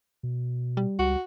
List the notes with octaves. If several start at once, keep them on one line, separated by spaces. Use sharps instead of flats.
B2
G3
C#2 F#4